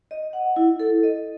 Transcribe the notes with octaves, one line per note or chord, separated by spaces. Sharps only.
D#5
F#5
E4
A4
D#5